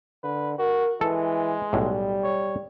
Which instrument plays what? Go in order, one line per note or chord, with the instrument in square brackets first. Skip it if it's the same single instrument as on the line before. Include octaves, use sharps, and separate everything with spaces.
[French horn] D3 [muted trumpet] B4
[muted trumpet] F#4 [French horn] A#4
[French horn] E3 [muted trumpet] G#3 [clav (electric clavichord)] A4
[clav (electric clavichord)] B1 A2 [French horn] G3
[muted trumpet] C#5